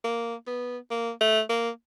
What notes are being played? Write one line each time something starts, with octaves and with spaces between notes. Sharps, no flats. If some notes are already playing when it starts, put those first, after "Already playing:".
A#3
B3
A#3
A3
A#3